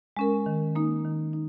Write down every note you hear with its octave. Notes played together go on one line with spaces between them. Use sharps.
G#3 C#4 A#4
D#3
A#3 D#4
D#3
D#4